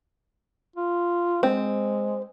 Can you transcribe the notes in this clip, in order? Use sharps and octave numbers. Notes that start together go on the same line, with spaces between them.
F4
G#3 C4